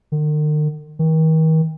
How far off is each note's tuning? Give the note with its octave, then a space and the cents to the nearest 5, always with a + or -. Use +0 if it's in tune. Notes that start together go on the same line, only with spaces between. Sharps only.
D#3 -45
D#3 +40